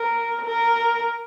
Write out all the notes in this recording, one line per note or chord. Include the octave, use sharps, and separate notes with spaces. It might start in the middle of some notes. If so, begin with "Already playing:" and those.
Already playing: A#4
A#4